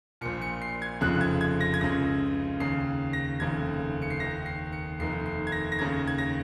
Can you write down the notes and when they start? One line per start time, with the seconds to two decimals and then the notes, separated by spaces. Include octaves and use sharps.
0.21 A#1 A#2 C#7
0.41 C#7
0.62 C7
0.82 G#6
1.01 F1 F2 C#3 F#6
1.21 G#6
1.41 G#6
1.61 A#6
1.74 G#6
1.81 C#2 C#3 A#6
2.60 D#2 C#3 C7
3.13 A#6
3.40 F1 D#2 C#3 G#6
4.02 C#7
4.10 C7
4.20 D#2 D#3 A#6
4.46 C7
4.72 C#7
4.99 F1 D#2 D#3 C7
5.26 C7
5.47 G#6
5.52 A#6
5.72 A#6
5.79 D#2 C#3 G#6
6.07 G#6
6.18 A#6